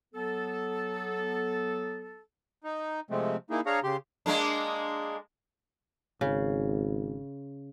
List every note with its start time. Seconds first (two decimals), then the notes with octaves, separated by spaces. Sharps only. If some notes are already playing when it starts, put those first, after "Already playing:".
0.14 F#3 B3 A4
2.64 D#4
3.11 C3 F3 G#3 A3 C4
3.50 A#3 D#4 E4 G#4
3.66 D4 G#4 C#5 F5 A#5
3.84 C#3 G4 C6
4.26 G#3 A#3 D4
6.21 G#1 C#3